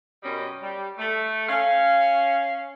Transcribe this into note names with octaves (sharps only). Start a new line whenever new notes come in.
F#2 B2 G3 C#4 D#5
G3
A3
C#4 F5